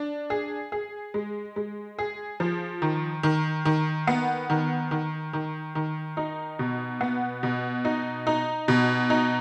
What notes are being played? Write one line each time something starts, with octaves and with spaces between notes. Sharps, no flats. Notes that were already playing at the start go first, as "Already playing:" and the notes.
Already playing: D4
G#4
G#4
G#3
G#3
G#4
F3
D#3
D#3
D#3
B3
D#3
D#3
D#3
D#3
D#4
B2
B3
B2
D#4
D#4
B2
D#4